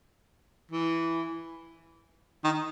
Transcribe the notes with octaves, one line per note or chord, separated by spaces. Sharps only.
E3
D#3